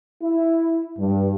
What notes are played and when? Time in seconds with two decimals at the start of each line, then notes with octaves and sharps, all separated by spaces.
0.23 E4
0.98 G2